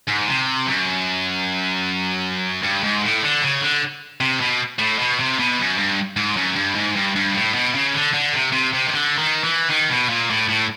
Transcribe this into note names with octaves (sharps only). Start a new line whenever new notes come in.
G#2
C3
F#2
G2
G#2
A2
D3
C#3
D3
C3
B2
A2
B2
C3
B2
F#2
G2
G#2
F#2
G2
G#2
G2
G2
A2
B2
C#3
D3
D3
C3
C3
C3
D#3
D3
D#3
E3
D#3
B2
A#2
A2
A2